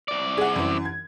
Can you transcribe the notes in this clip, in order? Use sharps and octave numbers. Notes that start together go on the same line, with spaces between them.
C2 D5
G#4 F#5
F#2 E3
G#6